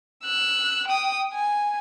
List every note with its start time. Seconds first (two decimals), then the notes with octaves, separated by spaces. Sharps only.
0.24 E6 F#6
0.88 G5 D#6
1.33 G#5